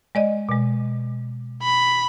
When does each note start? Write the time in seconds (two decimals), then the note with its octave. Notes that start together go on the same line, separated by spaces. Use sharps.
0.15 G#3 D5 D#5
0.49 B2 G#3
1.62 B5